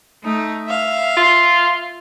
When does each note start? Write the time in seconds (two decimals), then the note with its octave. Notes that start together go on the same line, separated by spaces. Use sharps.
0.23 A3 D#4
0.68 E5 F5
1.17 F4